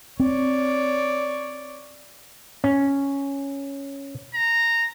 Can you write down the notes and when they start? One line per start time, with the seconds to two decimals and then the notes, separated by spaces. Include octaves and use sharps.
0.20 C4 C#5 D5
2.64 C#4
4.35 A#5